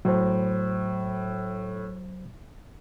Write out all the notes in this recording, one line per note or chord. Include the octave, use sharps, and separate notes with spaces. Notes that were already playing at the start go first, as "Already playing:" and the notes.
A2 F#3 C5